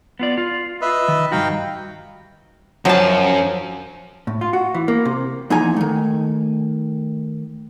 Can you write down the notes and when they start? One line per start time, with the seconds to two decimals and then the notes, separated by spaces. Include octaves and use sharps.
0.19 B3 F4 D5
0.38 F4
0.81 B4 D#5 E5
1.08 D#3
1.32 G2 D#3 D#4 F#4 F5 G5
2.85 F#2 F3 F#3 G5 A5
4.27 A2
4.41 F4
4.53 F#4
4.74 E3
4.88 A#3
5.05 C3
5.50 E2 A#2 F3 D#4 G#5 A#5
5.77 D#3 A3